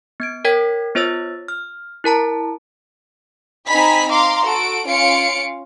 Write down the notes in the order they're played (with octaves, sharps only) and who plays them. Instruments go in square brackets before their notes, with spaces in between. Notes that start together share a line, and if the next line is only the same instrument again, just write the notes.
[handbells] B3 G#6 D7
A#4 C#5 G5 G#6 B6
B3 F4 C5 C#5 E6 A6
F6
E4 A#4 A5 A#5
[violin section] C4 D#4 G#5 A#5 B5 B6
F5 A#5 C6 D6
F#4 A4 D7
C#4 F4 F5 C#7 D7